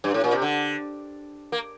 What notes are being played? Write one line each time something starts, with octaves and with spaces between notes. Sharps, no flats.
G2
A2
A#2
C3
D3
A#3